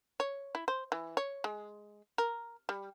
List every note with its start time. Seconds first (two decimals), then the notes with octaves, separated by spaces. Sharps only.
0.20 C#5
0.55 E4
0.68 C5
0.92 E3
1.17 C#5
1.44 G#3
2.18 A#4
2.69 G3